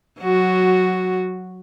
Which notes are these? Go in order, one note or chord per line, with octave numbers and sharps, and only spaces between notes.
F#3 F#4